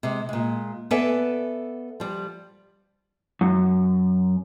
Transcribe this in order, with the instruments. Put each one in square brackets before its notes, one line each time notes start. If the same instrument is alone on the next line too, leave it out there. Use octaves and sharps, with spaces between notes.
[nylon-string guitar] C3 G#3
A#2 G#3
B3 A4 B4 D5 E5 G#5
F3 G3
[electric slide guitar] F#2